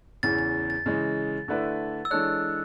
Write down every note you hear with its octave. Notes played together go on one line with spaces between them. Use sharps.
E2 C#3 E3 A6
A6
A6
C#3 E3 G#3
D3 A3 E4 B4 D5
E6
E3 G#3 D4 A4 C#5 F#6